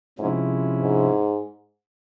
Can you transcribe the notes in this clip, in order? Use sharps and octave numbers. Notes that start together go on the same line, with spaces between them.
G#2 C3 F3 G#3 C#4 E4
G#2